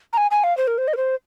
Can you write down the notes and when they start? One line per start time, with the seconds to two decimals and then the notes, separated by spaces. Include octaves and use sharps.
0.13 A#5
0.17 G#5
0.31 G#5
0.44 F5
0.57 C5
0.67 A#4
0.78 C5
0.88 D#5
0.93 A#4
0.97 C5